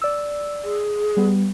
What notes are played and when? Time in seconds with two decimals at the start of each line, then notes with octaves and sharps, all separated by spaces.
0.02 D5 E6
0.64 G#4
1.17 G3 B3